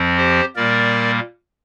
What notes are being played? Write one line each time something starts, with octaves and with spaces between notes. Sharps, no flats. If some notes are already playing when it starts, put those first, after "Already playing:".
Already playing: F2 F3 C4
G4 C5
A#2 G3 A#3 A#4 D5